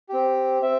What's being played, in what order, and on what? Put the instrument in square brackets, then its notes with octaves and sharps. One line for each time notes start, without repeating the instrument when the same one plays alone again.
[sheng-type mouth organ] C4 G4
C4 E5